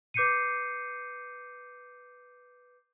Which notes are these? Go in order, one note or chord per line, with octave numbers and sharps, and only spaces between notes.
B4 D6 G6 C7 C#7 D#7